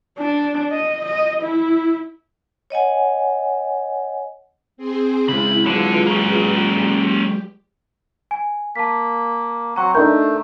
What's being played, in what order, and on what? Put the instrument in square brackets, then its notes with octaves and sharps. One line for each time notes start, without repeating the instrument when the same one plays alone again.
[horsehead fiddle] D4
D#5
D#5
E4
[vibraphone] C#5 D#5 F#5 G#5
[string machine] C4 G#4 C5
[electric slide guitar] C#3 G#3 [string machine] E4 [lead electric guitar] B5
[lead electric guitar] D3 [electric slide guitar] F#3 G#3 [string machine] F4 G#4 B4
[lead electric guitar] A#3 C#4
[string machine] G4
[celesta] G#5
[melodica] A#3 [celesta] A5 B6
[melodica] F#3 C4 F#5 [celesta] A#5 C#6
[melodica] A3 [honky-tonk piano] D4 D#4 A#4 [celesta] G6